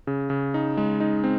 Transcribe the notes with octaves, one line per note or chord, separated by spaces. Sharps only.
C#3
C#3
D#4
G#3
D#4
C4